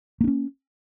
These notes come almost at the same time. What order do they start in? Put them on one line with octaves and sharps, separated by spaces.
A#3 D4 C#4